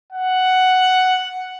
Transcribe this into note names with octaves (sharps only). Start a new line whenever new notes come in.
F#5